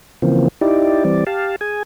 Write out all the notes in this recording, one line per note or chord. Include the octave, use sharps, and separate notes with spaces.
C#3 E3 F3 A#3 C4
D#4 E4 G4 D5
E3 G3 C4 D5
G4 F5 A5
G#4 G#5